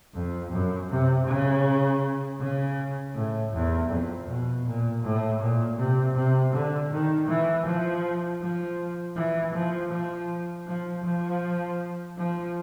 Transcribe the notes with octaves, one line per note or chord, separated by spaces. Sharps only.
F2
F#2
C3
C#3
C#3
A2
E2
F2
B2
A#2
A2
A#2
C3
C3
D3
D#3
E3
F3
F3
E3
F3
F3
F3
F3
F3